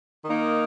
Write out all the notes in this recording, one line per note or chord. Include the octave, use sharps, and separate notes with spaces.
D#3 A#3 D#4